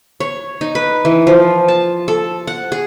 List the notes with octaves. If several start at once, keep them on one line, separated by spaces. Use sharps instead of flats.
C#5
D#4
B4
E3
F3
A5
A4
F#5
G#4